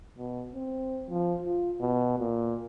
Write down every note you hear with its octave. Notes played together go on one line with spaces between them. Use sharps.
B2
C4
F3
F4
B2
A#2